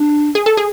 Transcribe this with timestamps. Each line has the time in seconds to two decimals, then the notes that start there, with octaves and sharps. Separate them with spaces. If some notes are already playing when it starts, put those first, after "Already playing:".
Already playing: D4
0.35 G#4
0.46 A4
0.57 G#4